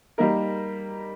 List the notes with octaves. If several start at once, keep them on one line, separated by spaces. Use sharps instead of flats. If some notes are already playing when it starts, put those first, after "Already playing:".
G3 A#3 D#4 A#4